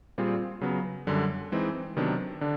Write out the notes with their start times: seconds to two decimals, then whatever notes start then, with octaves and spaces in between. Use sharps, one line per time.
0.18 A#2 G3 C4 F4 G#4
0.61 C#3 F#3 B3
1.07 F#2 D3 G3
1.52 E3 G#3 C4 D#4
1.96 C3 D#3 F#3 B3 D4
2.41 D3 D4